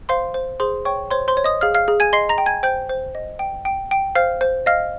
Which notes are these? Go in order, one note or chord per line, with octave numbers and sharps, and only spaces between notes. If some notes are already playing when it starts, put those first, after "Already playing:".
C5 F5 C6
C5
G#4 C5 C6
C#5 G5 C#6
C5 C#5 C6
C5 C6
C#5
D#5 D#6
G#4 F5 F6
F5 F6
G#4
G#5 G#6
D#5 C6 C7
A#5 A#6
G5
G#5 G#6
C5 G5 G6
C5
D#5
G5
G5
G5
C5 F5 F6
C5
D#5 F5 F6